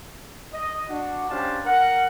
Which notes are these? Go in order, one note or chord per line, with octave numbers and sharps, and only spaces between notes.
D#5
D4 F#4 F#5
C#4 D4 G4 C5 F5 A5
A#4 F#5